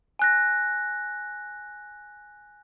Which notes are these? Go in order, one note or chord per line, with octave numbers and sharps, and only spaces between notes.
G#5 F#6 A#6